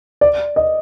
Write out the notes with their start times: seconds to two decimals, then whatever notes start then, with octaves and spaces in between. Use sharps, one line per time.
0.21 D5
0.56 D#5